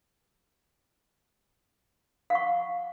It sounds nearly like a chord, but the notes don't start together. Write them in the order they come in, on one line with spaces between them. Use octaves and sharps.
F5 F#5 C#6